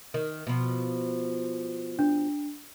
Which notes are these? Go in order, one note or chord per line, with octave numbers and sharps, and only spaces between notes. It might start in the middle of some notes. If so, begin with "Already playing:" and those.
D#3
B2 F3
D4